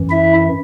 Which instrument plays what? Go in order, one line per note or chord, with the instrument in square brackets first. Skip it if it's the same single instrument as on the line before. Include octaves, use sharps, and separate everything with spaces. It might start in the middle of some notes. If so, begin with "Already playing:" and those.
Already playing: [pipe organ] F#2 E3
E4 E5